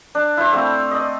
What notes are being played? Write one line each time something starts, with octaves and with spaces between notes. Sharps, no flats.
D4
E4 C5
A3 C4 F5
D5 D#5